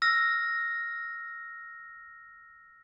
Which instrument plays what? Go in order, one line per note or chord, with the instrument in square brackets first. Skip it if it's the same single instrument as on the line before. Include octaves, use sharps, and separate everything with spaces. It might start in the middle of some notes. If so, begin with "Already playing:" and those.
[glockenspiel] E6 F6 A#6